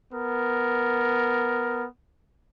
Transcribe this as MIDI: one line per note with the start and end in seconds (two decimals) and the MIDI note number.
0.14 1.85 59
0.14 1.85 70